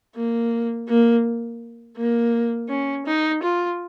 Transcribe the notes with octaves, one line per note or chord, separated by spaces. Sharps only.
A#3
A#3
A#3
C#4
D#4
F4